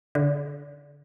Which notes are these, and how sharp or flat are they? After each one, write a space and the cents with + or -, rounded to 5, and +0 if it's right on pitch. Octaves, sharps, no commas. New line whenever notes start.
D3 -30